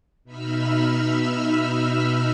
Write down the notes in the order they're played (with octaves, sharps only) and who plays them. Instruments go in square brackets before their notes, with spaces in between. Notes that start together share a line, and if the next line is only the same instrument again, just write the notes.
[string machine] B2 D#4 E5 B5 E6 F6